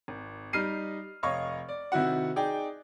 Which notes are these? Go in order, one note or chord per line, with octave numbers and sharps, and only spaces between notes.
G#1
G3 D#4 F6 C7 D#7
F1 C#5 D#5 F5 C#6
D5
C3 D#3 E4 F#4 F#5
D#4 G#4 D5 G5